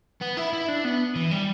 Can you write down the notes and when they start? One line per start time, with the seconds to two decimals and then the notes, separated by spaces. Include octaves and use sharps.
0.21 B3
0.37 E4
0.53 E4
0.68 D4
0.85 B3
1.16 E3
1.31 G3